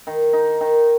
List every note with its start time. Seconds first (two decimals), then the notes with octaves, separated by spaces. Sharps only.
0.07 D#3
0.33 D#4
0.61 D#3